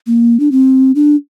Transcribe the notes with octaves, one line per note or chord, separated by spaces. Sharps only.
A#3
D4
C4
D4